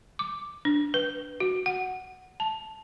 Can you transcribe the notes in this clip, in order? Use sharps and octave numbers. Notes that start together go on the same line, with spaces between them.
D6
D4
B4
F#4
F#5
A5